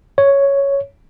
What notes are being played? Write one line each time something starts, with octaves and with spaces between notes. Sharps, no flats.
C#5